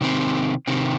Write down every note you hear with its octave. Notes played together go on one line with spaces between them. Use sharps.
C3 D#3 C4
C3 D#3 C4